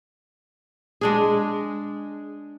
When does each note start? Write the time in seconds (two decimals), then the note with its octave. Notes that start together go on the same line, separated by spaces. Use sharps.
1.01 G#3 D4 G#4